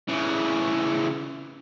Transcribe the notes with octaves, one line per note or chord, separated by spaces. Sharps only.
C#3 E3